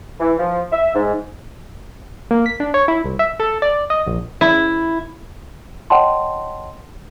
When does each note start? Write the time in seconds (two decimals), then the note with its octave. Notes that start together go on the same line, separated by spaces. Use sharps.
0.20 E3
0.39 F3
0.72 E5
0.94 G#2
2.31 A#3
2.46 B6
2.60 D4
2.74 C#5
2.88 E4
3.04 C2
3.19 E5
3.40 A4
3.62 D5
3.90 D#5
4.07 A#1
4.41 E4
5.90 C#5 D#5 F#5 G5 A5 C6